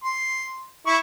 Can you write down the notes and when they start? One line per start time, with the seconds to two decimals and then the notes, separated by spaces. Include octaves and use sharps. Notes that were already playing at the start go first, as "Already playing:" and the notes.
0.04 C6
0.87 E4 C#6